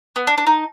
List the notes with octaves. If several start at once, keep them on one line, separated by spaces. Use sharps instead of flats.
B3
D4
D4
D#4